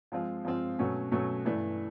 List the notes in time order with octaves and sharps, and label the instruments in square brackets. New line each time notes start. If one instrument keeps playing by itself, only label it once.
[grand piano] F3 G#3 C4 F4
F3 G#3 C4 F4
B2 F#3 A3 C#4 F#4
B2 F#3 A3 C#4 F#4
G2 E3 A3 D4